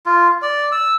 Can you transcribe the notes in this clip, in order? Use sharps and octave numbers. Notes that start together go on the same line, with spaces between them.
F4
D5
E6